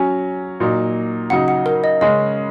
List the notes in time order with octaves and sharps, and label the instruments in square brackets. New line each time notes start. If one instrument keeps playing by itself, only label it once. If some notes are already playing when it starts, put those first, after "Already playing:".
Already playing: [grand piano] F#3 C#4 [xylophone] G#5
[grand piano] A#2 F#3 D#4
[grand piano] C#3 F#3 D#4 [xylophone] F#5
[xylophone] F#5
A#4
D#5
[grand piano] C#3 G#3 C#4 [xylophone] D#5